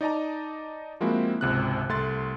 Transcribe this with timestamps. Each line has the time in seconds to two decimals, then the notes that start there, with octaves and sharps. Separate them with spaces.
0.01 D#4 D5 D#5 A5 A#5
1.00 F3 G#3 A#3 C4 E4 F#4
1.41 G#1 C#2 C3 F#6
1.89 C2 A3 C6 A6